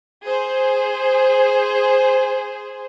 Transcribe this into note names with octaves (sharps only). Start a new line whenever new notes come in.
G#4 C5